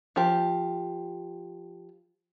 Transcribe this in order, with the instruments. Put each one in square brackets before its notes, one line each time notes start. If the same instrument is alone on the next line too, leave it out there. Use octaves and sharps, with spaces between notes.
[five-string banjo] F3 G4